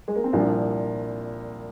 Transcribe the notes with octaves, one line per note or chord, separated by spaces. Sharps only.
G#3
A#3
C4
C2 A#2 F3 D4